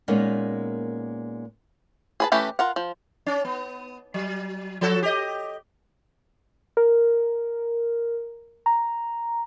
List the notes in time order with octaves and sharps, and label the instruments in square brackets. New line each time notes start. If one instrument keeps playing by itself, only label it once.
[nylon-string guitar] A#2 G#3 A#3 B3 C#4 D#4
[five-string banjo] G#4 B4 A5
E3 A3 C#4 G4 B4
F4 A#4 F#5
F3
[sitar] C#4
B3
F#3
F3 F#4 A4
G4 D#5
[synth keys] A#4
A#5